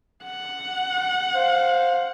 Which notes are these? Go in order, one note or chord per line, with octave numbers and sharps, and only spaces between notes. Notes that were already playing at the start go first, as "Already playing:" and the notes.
F#5
C5 F5